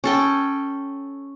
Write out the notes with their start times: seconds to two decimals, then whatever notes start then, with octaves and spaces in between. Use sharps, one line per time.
0.04 C#4 A4 G5